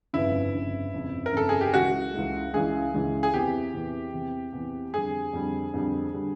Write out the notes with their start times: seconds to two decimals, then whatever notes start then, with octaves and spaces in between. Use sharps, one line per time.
0.13 G1 F2 C#3 E4
0.54 G1 F2 C#3
0.93 G1 F2 C#3
1.26 A#4
1.33 G1 F2 C#3 A4
1.49 G#4
1.61 G4
1.73 C#2 C#3 E3 G#3 F#4
2.13 C#2 C#3 E3 G#3
2.53 C#2 C#3 E3 G#3 G#4
2.94 C#2 C#3 E3 G#3
3.23 G#4
3.34 E2 C3 E3 G4
3.73 E2 C3 E3
4.13 E2 C3 E3
4.53 E2 C3 E3
4.93 F2 D3 G3 G#4
5.33 F2 D3 G3
5.74 F2 D3 G3
6.14 D3 G3